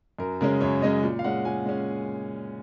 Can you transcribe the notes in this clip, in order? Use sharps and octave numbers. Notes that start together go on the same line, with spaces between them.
F#2 A#4
C#3 G#3 C#4 A#4
F#2 C#5
C#3 G#3 C#4 D#5
A#2
F5
G#3 C#4 F#5
A#2 G#5
G#3 C#4